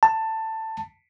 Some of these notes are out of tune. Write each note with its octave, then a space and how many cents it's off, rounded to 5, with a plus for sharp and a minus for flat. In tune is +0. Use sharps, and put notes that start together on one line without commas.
A5 +15